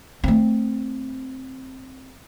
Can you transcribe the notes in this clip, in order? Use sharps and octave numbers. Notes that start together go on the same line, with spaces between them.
A3 C4